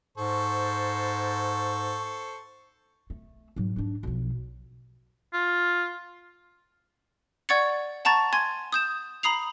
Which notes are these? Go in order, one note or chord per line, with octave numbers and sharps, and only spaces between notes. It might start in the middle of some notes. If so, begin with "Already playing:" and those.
G#2 A4 C5 C#6
A3
G#2 F#3
G#2 D4
B1 F3
F4
D5 F#5 C#6 G#6 A6 C#7
F#5 A5 A#5 C#6 A6
G#5 C6 G#6
D#6 G6 E7
A#5 B5 D#6 C7 F7